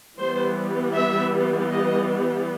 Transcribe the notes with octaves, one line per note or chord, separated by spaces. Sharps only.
E3 G3 B3 C5
E5
D#5